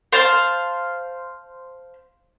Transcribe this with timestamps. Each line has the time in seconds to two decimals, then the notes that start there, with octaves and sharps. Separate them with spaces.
0.12 C5 F5 A5